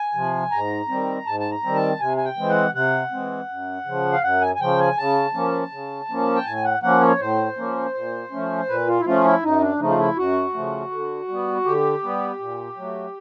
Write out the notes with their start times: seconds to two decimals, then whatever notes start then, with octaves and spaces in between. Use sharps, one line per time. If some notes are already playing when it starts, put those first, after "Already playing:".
Already playing: G#5
0.15 C3 F3
0.51 G#2 A#5
0.88 D#3 G3 C4
1.26 G#2 A5
1.40 A5
1.51 A#5
1.63 D#3 G3 C4
1.75 A5
2.00 C3 G#5
2.17 G#5
2.25 G5
2.38 E3 G#3 C4
2.49 F#5
2.74 C3 F#5
3.11 E3 G#3 C4
3.48 F#2
3.85 C#3 F3
4.13 F5
4.22 F#2 F#5
4.41 G#5
4.55 G#5
4.60 C#3 F3 G5
4.79 G#5
4.97 C#3 A5
5.34 F3 A#3 C#4
5.71 C#3
6.09 F3 A#3 C#4
6.35 G5
6.45 A2 G#5
6.64 F#5
6.82 F3 A#3 C#4 F#5
7.01 C#5
7.19 A2 C5
7.57 F3 A#3 C#4
7.94 A#2
8.31 F3 A3 C#4
8.68 A#2 B4
8.87 F4
8.99 E4
9.05 F3 A3 C#4 F4
9.24 E4
9.43 F#2 D#4
9.61 D4
9.79 C#3 F3 A3 D#4
9.90 F4
9.98 E4
10.16 F#2 F#4
10.54 C#3 F3 A3
10.91 D3
11.28 G3 B3
11.65 D3 G4
12.03 G3 B3
12.39 A#2
12.77 F#3 A3